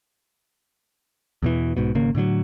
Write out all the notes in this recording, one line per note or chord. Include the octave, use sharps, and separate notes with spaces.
E2 B2 E3
B1 G#2 B2
G#1 C#3 A#3
A2 D3 E3 F#3